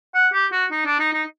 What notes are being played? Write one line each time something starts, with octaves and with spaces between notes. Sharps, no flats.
F#5
G4
F#4
D#4
D4
D#4
D#4